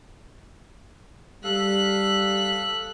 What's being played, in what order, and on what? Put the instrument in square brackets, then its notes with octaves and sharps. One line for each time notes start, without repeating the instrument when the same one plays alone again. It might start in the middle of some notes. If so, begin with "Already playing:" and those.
[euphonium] G3 [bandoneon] A4 F5 [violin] F#6 B6